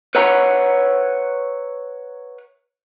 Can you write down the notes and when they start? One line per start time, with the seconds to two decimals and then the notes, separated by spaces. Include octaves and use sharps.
0.15 B4 C#5 E5 F#5 A#5